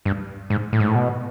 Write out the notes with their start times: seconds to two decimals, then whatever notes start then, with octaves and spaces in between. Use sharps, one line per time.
0.05 G2
0.50 G#2
0.73 A2
0.80 G#2
0.88 A2
0.95 B2